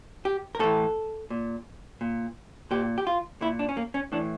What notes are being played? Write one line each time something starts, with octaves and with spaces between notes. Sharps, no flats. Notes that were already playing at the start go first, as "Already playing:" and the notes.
G4
A#4
A2 E3 A4
A#2
A#2
A#2 G4
G4
F4
A#2 E4
D4
C#4
A#3
C#4
A2 E3 D4